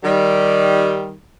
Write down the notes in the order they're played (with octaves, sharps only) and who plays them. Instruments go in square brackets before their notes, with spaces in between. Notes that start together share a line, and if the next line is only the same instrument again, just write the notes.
[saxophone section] D#3 G3